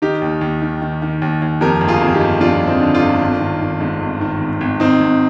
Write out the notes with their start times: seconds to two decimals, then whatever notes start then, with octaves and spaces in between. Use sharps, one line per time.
0.02 D#3 D#4 G4
0.22 D#2
0.41 D#2
0.62 D#3
0.81 D#3
1.02 D#3
1.22 D#2
1.42 D#2
1.61 F2 G4 A#4
1.81 G1
1.88 F4 G#4
2.01 F2
2.14 D#4 G4
2.21 G1
2.41 F2 D4 F4
2.62 G1
2.67 C4 D#4
2.80 D3
2.94 D4 F4
3.00 G1
3.21 G#1
3.40 D#3
3.61 D#3
3.80 G#2
4.01 G#1
4.21 D#3
4.41 G#1
4.61 G#1
4.80 D#3 C4 D#4
5.00 G#1